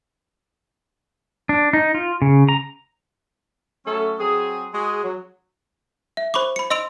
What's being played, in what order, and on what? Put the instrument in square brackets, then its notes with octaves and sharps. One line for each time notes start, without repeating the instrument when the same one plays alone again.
[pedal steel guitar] D4
D#4
F4
C#3
A#5
[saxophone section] F#3 A3 C#4 A4
F#3 C4 G#4
G#3 F#4 G#4
F#3
[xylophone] E5
C5 B5 C#6 D6
B5 C#7
D#5 C6 E6 D7 F7